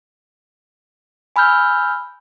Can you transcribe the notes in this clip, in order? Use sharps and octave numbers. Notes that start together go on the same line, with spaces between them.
G#5 B5 E6 F6 G6